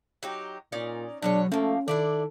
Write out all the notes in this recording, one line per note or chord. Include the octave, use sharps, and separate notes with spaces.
F#3 D#4 G4
A#2 C#4 D#4 D5
B2 F#3 G#3 D4 C#5
F3 A3 A#3 C#4
D#3 D4 E4 A4 D5